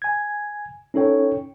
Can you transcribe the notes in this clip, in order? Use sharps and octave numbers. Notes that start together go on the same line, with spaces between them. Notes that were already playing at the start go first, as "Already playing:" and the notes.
G#5 G#6
C#4 D#4 A4 C#5 G5